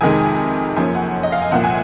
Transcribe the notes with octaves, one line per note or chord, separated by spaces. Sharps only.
F2 C3 D#3 G#3 G#5
F#2 F3 A#3 C#4 G#5
F#5
D#5
F5
G#5
C2 A#2 F3 C4 F#5
G#5